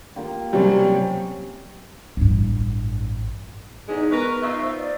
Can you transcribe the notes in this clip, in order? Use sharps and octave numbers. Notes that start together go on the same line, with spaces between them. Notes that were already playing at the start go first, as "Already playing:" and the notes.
A#3 F4 G4
C3 F#3 G3 C4 C#4
A1 G2
E2 D3 G#3 D#4
B3 A#4 B4 C#6
D#4 F4 E5
C5
D5